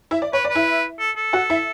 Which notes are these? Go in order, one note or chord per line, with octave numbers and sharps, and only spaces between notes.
E4 E5
D5
B4 C#5
D5
B4
E4 E5
A4
A4
F#4 F#5
E4 E5